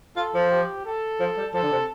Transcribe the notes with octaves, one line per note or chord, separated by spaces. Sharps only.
F4 A4
F3
G4
A4
F3
G3
F3 A4
D3
C3